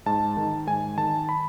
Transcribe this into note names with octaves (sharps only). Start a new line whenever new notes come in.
G#2 A5
D#3
G#2 G#5
D#3 A5
B5